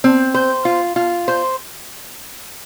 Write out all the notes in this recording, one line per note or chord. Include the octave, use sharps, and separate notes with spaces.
C4
C5
F4
F4
C5